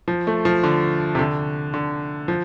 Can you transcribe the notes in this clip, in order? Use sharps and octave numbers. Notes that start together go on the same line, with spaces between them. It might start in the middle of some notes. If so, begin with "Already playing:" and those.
F3
A3
F3
D3
C3
D3
D3
F3